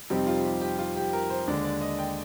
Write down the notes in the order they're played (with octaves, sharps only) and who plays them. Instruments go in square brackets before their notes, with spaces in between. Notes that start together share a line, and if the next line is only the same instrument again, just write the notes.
[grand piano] F2 C3 G3 C4 D#4 [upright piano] G4
[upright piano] F4
G4
G4
F4
G4
A#4
C5
[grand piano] D#2 D3 G#3 D4 [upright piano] D5
[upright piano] D5
D#5
G5